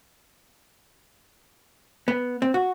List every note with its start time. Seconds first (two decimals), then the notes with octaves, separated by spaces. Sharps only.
2.08 B3
2.42 C4
2.54 F#4